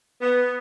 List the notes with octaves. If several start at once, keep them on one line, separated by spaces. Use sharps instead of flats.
B3